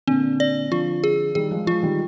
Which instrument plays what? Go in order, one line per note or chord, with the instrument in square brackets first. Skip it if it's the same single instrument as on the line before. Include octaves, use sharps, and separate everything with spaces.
[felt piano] A#2 D3 [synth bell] C4
[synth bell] D5
[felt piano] D3 F3 [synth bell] F4
[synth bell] G#4
[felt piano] D#3 G3 [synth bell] G#4
[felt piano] F3 G#3
[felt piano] F3 G#3 [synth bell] F4
[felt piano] D#3 G3